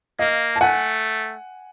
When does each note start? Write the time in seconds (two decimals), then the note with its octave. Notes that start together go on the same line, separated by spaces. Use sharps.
0.19 A#3 D#5 F5
0.56 A5
0.61 A3 F#5 G#5